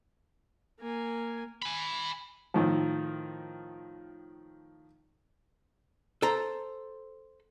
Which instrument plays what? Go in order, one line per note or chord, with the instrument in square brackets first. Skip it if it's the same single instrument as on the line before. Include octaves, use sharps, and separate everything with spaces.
[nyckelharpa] A#3 G#5
[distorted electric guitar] G#5 B5
[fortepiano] A2 D#3 F3
[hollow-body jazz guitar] A4 C5 A#5